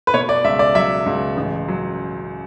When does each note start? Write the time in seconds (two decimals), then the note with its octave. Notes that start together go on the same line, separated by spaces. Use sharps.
0.07 B4
0.14 B2 C#5
0.29 D5
0.44 C#2 E5
0.59 D5
0.75 F#3 E5
1.06 C#2
1.37 A1
1.68 F#3